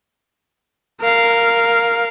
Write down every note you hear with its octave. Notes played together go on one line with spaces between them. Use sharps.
A#4 F5